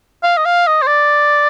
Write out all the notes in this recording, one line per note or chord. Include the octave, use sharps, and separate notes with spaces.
F5
D#5
F5
D#5
C5
D5